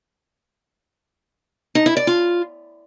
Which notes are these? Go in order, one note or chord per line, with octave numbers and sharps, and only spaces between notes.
D#4
E4
D5
F4